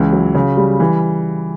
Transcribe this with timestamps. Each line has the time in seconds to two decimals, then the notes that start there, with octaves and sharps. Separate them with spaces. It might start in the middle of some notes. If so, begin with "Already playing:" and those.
Already playing: C#2 E3
0.13 F#3
0.35 C#3
0.57 G3
0.80 E3